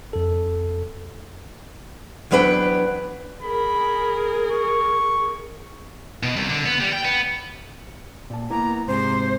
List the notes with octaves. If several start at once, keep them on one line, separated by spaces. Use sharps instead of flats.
F2 A4
E2 F#3 B3 D4 B4 G5
G#4 A#4 B5
C#6
B2
C2
D3
B3
G3
G5
B3
A#2 A5
A#3 B3 E4 A#5
G#2 C3 G#4 C5